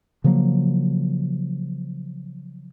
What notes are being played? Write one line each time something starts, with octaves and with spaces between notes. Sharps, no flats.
C#3 F3 F#3 A#3